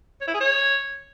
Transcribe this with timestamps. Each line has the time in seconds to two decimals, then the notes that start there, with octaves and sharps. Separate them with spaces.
0.21 C#5
0.27 E4
0.34 G#4
0.40 C#5